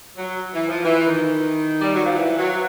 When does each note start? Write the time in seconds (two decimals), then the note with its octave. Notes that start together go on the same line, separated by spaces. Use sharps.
0.17 F#3
0.54 E3
0.68 F3
0.83 E3
1.06 D#3
1.81 G3
1.93 F#3
2.04 F3
2.16 E3
2.38 F#3